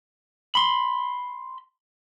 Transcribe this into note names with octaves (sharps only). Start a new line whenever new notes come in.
B5 C6